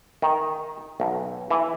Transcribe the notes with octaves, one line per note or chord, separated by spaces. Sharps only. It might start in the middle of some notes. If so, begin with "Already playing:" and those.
D#3
B1
E3